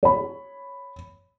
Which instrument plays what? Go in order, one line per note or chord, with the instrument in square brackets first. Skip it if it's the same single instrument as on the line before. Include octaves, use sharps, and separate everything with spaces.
[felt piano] C#5 B5